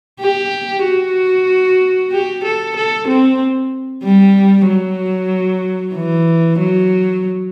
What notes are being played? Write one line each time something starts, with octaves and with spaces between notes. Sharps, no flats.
G4
F#4
G4
A4
A4
C4
G3
F#3
E3
F#3